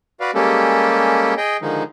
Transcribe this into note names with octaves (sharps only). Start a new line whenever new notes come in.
F#4 B4 D5 F5
G3 G#3 A#3 C#4 G4 A4
G#4 D#5 G5
D3 D#3 F3 G#3 D#4